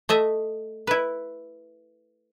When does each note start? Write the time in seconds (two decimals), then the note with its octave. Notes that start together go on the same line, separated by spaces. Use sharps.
0.09 A3 D#5 E5
0.87 E4 B4